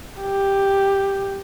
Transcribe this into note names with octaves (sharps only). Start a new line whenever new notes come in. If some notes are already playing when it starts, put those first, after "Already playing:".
G4